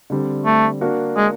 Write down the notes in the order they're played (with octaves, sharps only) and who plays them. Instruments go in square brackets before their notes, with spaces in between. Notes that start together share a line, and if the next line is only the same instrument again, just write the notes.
[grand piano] D3 G3 C4
[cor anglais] A3
[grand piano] A#3 D4 F#4 A#4
[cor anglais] G#3